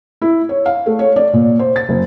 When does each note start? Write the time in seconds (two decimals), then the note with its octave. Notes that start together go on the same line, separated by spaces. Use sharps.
0.22 E4
0.49 C#5
0.66 F5
0.86 A3
0.99 C#5
1.16 D5
1.33 A#2
1.59 C5
1.76 A6
1.89 F#1